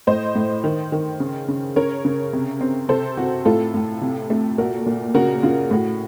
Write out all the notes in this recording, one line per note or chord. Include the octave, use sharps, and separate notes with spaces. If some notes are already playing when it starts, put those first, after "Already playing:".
A2 C5 D#5
A2
D#3
D#3
C#3
C#3
C#3 A#4 C#5
C#3
C3
C4
C3 A4 C5
C3 F#4
A2 F4 A4
A2
C3
A3
A#2 F#4 A#4
A#2
C#3 F#4 A#4
C#3 F4
A2 F#4